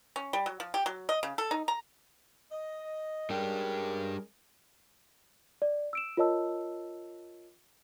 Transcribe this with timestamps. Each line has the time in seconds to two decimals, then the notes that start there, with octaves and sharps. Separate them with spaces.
0.16 C#4
0.33 G3
0.46 F#3
0.60 F3
0.74 G4
0.86 F#3
1.09 D#5
1.23 C#3
1.38 A4
1.51 D#4
1.68 A#5
2.52 D#5
3.30 G3 G#3 C#4 D4 G4 A#4
5.62 D5
5.93 E6 D7 E7
6.17 F4 A#4 C#5 D#5 A5 E6